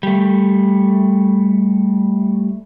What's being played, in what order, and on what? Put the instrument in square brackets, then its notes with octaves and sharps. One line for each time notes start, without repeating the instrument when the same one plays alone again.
[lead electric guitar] G3 A3